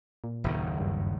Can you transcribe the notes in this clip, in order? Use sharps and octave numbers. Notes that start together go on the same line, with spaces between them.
A#2
F#1 D#2 D#3
G2